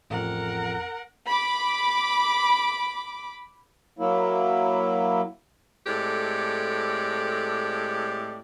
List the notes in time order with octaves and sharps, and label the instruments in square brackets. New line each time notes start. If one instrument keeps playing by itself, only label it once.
[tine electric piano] A1 F2 [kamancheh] A#4 F#5
[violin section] B5 D6
[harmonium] F#3 A#3 E4
[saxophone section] A2 G#3 C4 G4 A4 D5